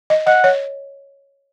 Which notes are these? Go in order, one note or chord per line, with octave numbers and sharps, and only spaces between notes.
D#5
D#5 F#5
C#5